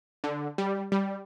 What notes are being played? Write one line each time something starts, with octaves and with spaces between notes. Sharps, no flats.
D3
G3
G3